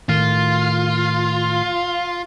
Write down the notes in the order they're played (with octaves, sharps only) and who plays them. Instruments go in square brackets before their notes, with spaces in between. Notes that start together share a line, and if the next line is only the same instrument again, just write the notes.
[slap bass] A2 D#3 [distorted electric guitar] F4